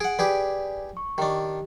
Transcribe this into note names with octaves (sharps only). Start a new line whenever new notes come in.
G#4 F#5 D7
G4 G#4 B4 D5
C#6
D#3 D4 G4